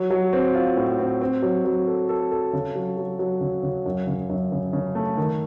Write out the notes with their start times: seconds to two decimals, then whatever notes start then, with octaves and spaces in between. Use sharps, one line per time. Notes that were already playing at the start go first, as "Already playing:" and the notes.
Already playing: F#3
0.10 F#3
0.33 C4
0.55 F4
0.77 A2
0.99 C4
1.21 C4
1.42 F#3
1.65 F#3
1.87 A4
2.09 A4
2.31 A4
2.53 C#3
2.75 F#3
2.97 F#3
3.19 F#3
3.41 C#3
3.63 C#3
3.86 F#2
4.07 C#3
4.29 F#2
4.52 C#3
4.73 C#3
4.95 A3
5.17 D#3